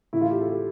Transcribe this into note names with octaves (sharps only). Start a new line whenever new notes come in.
A2 E3 E4
F4
G4
A4
G4